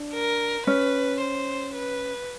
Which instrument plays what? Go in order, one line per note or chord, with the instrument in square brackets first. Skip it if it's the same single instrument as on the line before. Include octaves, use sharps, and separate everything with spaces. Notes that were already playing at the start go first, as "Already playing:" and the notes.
Already playing: [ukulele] D4
[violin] A#4
[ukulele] C#4 [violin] B4
[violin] C5
B4